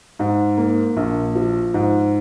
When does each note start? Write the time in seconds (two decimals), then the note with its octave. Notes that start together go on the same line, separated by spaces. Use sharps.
0.19 G#2
0.58 A#3
0.97 A#1
1.35 F3
1.74 G#2